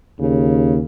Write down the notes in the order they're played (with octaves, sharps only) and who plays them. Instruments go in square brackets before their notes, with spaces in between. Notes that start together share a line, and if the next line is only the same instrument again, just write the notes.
[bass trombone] D#2 [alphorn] C#3